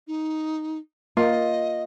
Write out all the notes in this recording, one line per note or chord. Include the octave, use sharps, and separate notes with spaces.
D#4
A#3 F4 D#5